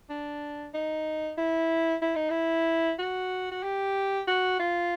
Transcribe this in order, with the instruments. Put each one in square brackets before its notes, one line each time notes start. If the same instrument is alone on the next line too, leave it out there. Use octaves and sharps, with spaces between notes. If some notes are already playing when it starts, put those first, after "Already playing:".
[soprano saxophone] D4
D#4
E4
E4
D#4
E4
F#4
F#4
G4
F#4
F4